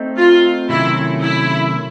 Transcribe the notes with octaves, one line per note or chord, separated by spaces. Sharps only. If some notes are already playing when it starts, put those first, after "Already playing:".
Already playing: A3 C4 D#4
F4
C3 D#3 F#3 A3 C#4 E4
E4